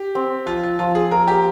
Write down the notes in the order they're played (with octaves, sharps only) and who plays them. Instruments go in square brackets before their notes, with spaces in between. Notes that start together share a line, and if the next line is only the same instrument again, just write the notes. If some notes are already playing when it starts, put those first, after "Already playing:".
Already playing: [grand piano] G4
[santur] C4
[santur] F3 [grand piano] F4
[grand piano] F4
[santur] F3 [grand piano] F4
[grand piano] G#4
[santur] A#3 [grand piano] A#4
[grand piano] G4